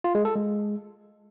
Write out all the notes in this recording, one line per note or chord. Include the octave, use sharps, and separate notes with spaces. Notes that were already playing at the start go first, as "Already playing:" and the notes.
F4
G#3
A4
G#3